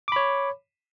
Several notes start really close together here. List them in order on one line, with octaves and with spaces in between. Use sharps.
D6 B5 C#5